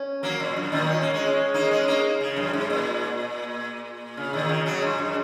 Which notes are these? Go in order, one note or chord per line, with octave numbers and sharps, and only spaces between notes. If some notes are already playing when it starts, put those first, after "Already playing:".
Already playing: C#4
F#3 A#3
A#2
F#2
A#2 D#3
C#4
A#3
G#3 C#4
A#3 D#4
G#3 C#4
A#3 D#4
C#3
F#2
G#2
A#2
C#3
A#2 D#3
C#3
C#3 F#3
G#2
F#2